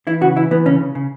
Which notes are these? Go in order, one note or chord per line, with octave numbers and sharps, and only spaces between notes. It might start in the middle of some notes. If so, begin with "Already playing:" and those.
E3 E4
C#3 F#4
E3 E4
E3 B3
C#3 C#4
C#3
C#3